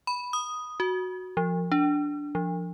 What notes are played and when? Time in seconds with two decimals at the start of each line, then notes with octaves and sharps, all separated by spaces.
0.07 B5
0.33 D#6
0.80 F#4
1.37 F3
1.72 D4
2.35 F3